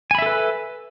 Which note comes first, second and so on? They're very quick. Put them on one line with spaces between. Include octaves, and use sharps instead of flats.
G#5 B5 E5 A4 B4